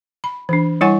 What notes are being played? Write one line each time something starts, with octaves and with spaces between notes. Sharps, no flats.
B5
E3 D4
G3 E4 C#5 F#5 G#5 C#6